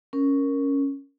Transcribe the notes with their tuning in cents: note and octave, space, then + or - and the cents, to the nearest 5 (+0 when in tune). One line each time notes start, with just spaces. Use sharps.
C#4 +0 A#4 +0